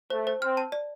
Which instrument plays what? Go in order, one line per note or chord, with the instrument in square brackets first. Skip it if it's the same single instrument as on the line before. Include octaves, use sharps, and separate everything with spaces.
[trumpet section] A3 [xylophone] C5
[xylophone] C5
[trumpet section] C4 [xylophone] F6
[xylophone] A5
D5